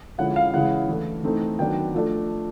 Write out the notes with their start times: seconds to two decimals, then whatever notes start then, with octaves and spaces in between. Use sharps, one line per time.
0.18 D3 F3 G#3 C#4 E4 F#5
0.36 F5
0.53 C#3 E3 G#3 C#4 E4 F#5
0.88 E3 A3 D4
1.23 E3 A3 C4 D#4
1.59 D#3 F#3 B3 D4 G5
1.94 F3 A3 D4